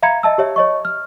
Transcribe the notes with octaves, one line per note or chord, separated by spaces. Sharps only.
E5 F5 A#5 B5 G#6 C#7
D#5 E5 A5 E6
G4 C#5 E5
C#5 D#5 C#6
F6